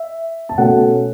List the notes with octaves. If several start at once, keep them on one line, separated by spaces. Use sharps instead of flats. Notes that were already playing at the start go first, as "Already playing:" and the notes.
Already playing: E5
A5
B2 A3 C#4 F#5